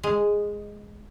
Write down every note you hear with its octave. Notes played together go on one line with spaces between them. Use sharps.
G#3